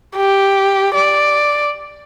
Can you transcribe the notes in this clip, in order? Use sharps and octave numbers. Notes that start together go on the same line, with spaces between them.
G4
D5